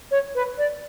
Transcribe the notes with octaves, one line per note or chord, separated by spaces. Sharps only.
C#5
B4
D5